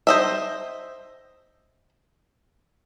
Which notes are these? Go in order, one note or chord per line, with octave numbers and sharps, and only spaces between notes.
C5 D#5 E5